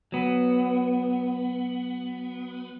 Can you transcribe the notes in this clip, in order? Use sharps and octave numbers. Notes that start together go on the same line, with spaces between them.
F#3 B3